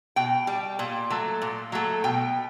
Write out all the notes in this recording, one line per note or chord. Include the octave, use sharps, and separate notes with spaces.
B2 G5
G3
A#2
F#3 A3
A#2
F#3 A3
B2 G5